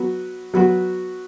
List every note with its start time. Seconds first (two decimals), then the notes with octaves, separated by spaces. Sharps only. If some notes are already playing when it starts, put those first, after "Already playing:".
Already playing: F#3 B3 F#4
0.54 F#3 B3 F#4